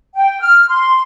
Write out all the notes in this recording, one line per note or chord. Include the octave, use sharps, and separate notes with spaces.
G5
F6
C6